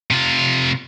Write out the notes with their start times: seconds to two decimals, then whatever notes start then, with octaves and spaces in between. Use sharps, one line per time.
0.11 C3 F4